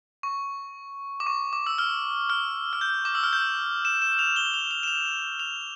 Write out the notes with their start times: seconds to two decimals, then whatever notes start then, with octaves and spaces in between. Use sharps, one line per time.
0.23 C#6
1.20 D6
1.27 C#6
1.53 D6
1.67 E6
1.78 F6
2.30 F6
2.73 F6
2.81 G6
3.05 D6
3.15 E6
3.24 F6
3.33 G6
3.85 E7
4.02 E7
4.19 F7
4.36 G7
4.54 F7
4.71 F7
4.83 E7
4.88 F7
5.40 F7